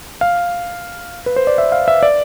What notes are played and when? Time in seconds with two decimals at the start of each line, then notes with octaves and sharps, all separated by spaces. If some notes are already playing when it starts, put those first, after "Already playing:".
0.21 F5
1.26 B4
1.36 C5
1.47 D5
1.58 E5
1.72 F5
1.88 E5
2.03 D5